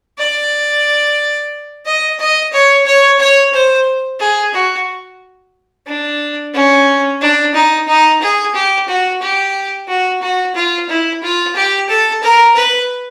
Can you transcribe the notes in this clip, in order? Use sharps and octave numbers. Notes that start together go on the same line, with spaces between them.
D5
D#5
D#5
C#5
C#5
C#5
C5
G#4
F#4
D4
C#4
D4
D#4
D#4
G#4
G4
F#4
G4
F#4
F#4
F4
E4
F4
G4
A4
A#4
B4